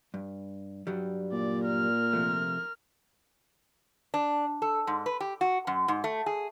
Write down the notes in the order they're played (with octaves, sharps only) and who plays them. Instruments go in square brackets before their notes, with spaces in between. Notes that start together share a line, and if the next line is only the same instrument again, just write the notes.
[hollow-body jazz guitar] G2
G2 F#3 G3
[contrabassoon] A#2 [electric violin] D5
[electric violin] A#4 F6
[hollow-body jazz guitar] C3 F3 A3
[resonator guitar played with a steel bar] D4
A4
G#2
B4
G4
F#4
F#2
G#2
A3
G#4